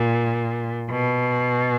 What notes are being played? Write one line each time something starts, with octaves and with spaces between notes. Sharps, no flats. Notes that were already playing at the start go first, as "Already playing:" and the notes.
Already playing: A#2
B2